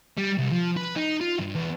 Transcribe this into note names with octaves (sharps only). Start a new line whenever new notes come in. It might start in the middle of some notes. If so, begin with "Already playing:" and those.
G3
C2
F3
B4
D#4
F4
G2
E2